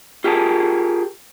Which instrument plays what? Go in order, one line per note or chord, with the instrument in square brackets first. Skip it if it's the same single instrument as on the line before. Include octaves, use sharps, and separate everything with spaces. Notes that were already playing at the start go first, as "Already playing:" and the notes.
[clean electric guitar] F4 G4 G#4 A#4 A5